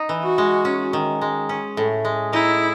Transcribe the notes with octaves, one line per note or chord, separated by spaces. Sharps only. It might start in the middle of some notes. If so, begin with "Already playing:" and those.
Already playing: D#4
E3
F#4
G#3
C#4
D#3
G#3
C#4
A2
G#3
D#4 E4